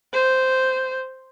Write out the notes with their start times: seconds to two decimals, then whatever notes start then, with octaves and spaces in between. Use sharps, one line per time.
0.14 C5